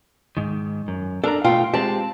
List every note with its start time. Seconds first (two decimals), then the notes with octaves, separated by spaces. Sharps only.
0.37 G#2 D#3
0.88 F#2
1.24 D4 A4 A#4 A#5
1.44 B2 A3 F4 G5
1.74 G#3 C4 G4 A5